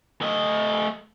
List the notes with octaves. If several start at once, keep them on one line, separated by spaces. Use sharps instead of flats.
A3 D#5